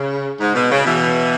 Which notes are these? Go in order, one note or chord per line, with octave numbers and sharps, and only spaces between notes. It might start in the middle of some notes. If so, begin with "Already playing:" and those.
Already playing: C#3
G#2
B2
C#3
B2 E3